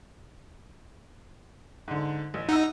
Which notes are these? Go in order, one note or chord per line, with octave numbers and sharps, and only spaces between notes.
G#2 D3
A1
D#4 F#5 E6